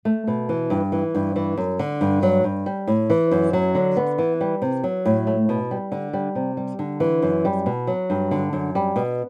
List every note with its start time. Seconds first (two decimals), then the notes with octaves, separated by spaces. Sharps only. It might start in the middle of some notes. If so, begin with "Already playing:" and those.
0.05 A3
0.27 B2
0.49 E3
0.70 G2
0.92 E3
1.15 G2
1.36 E3
1.58 F#2
1.79 D3
2.01 G2
2.23 F#3
2.44 G2
2.66 G3
2.88 A2
3.10 E3
3.31 F#2
3.53 F#3
3.75 D3
3.97 B3
4.18 E3
4.41 G3
4.62 C3
4.84 F#3
5.06 A2
5.27 A3
5.49 B2
5.71 G3
5.92 D3
6.13 G3
6.35 C3
6.57 G3
6.79 D3
7.00 E3
7.22 F#2
7.45 G3
7.66 B2
7.87 F#3
8.10 G2
8.31 D3
8.53 F#2
8.75 G3
8.96 B2